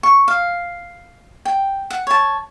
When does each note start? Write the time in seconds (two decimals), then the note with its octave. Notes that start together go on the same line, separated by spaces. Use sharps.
0.03 C#6
0.28 F5
1.45 G5
1.90 F#5
2.07 C#5 A5